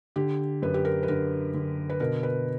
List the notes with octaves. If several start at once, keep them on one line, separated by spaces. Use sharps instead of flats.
D3 G4
F#2 B4
G4
A#4
B4
D3 A#4
D3
B4
B2 A#4
B4